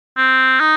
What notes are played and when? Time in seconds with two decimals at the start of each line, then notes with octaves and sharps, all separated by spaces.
0.17 C4
0.60 D#4